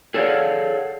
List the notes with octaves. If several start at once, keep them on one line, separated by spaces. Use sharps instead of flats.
G#4 A4 C#5 D5 F5 F#5